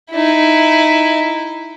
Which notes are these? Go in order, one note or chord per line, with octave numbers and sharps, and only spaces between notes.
D#4 E4